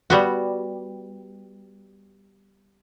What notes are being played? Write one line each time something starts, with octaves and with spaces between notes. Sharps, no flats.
G3 B3 F#4